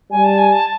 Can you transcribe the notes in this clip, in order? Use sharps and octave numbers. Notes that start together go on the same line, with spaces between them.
G3 G#5
A5
G#5
A5